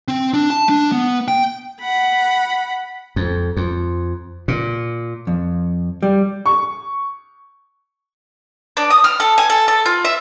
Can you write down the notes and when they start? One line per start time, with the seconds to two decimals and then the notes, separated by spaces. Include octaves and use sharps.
0.08 C4
0.34 D4
0.50 A5
0.69 D4
0.92 B3
1.28 G5
1.81 F#5 B5
3.16 F2
3.57 F2
4.48 A#2
5.27 F2
6.03 G3
6.46 C#6
8.77 D4
8.90 D#6
9.04 F6
9.20 A4
9.38 G#5
9.50 A4
9.68 A4
9.86 F4
10.05 E5